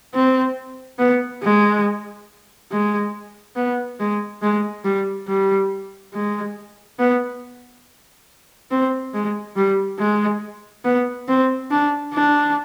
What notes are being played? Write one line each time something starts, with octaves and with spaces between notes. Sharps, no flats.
C4
B3
G#3
G#3
B3
G#3
G#3
G3
G3
G#3
B3
C4
G#3
G3
G#3
B3
C4
D4
D4